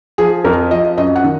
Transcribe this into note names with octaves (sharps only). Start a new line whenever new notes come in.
F3 G#4
F2 A#4
F3 D#5
F#2 D#5
F#5
D#3